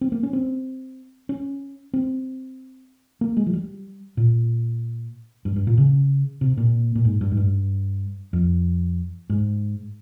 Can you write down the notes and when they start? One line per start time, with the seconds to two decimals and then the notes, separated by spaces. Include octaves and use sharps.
0.01 C4
0.12 A#3
0.23 C#4
0.33 C4
1.29 C#4
1.94 C4
3.21 A#3
3.37 G#3
3.47 F3
3.53 G3
4.17 A#2
5.45 G2
5.56 G2
5.67 A#2
5.78 C#3
6.41 C3
6.57 A#2
6.95 A#2
7.05 G#2
7.21 G2
7.32 G#2
7.37 G2
8.33 F2
9.30 G#2